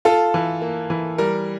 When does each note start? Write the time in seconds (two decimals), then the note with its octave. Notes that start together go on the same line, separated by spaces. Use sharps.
0.05 F4 A4
0.34 E3
0.62 A#3
0.90 E3
1.18 G3 A#4